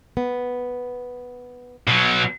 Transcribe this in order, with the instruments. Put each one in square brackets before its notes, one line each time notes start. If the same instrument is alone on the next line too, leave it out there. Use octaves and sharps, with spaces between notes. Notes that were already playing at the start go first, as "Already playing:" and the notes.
[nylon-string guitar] B3
[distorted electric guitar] B2 F#3